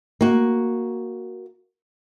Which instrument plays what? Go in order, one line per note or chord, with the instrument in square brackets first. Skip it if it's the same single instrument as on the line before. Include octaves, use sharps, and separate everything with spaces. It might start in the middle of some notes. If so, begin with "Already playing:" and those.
[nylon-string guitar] A#3 F#4